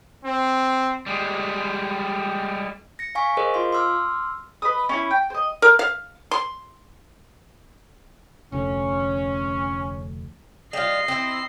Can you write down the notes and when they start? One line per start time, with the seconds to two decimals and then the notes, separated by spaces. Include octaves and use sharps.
0.25 C4
1.06 G3 G#3
2.99 A#6 C#7
3.15 F5 G#5 C#6 B6
3.37 G#4 A#4 C5 D#5
3.54 F4 F5 C6
3.72 C6 D6 E6 F6
4.62 B4 D#5 D#6
4.89 C#4 D#4 E4
5.11 G5
5.30 C5 D#5
5.62 A#4
5.79 F5
6.31 C6
8.52 F1 D2 D3 C#4
10.73 G3 F4 D#5 C7
11.08 C4 E4